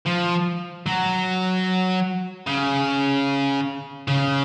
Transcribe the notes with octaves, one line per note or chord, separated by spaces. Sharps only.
F3
F#3
C#3
C#3